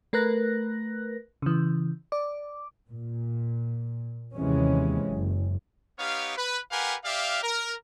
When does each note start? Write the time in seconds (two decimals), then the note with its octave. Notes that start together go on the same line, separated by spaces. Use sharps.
0.13 A3 A#4 B4 F#6 A#6
1.42 C#3 E3
2.12 D5 D6
2.90 A#2
4.35 D#2 C3 E3 G#3 C#4
5.04 F#1
5.99 B3 D#4 G4 C#5 F5
6.37 B4
6.71 G4 A#4 B4 F5 F#5 G#5
7.05 G4 D5 E5 F5
7.43 A#4